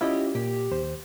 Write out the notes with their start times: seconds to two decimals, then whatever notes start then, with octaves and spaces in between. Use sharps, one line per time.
0.01 C#4 E4 F4 G4 D#5
0.35 A#2 G4
0.71 D#2 C5